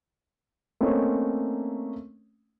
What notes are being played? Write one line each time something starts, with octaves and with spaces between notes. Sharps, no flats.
A3 A#3 C4 C#4 D#4 C#5